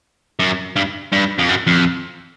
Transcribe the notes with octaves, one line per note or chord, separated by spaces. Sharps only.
F#2
G2
G2
F2
F#2
F2